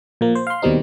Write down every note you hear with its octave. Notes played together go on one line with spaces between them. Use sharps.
A#2 F3 A#3
C5
F5 C6
D#2 B2 D#3 G3 C4 D#4